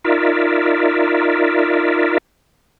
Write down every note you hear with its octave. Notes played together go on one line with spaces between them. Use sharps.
D#4 F4 A#4 D5 E5